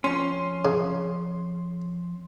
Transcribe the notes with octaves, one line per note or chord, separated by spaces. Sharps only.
F2 C#4 C6
C#3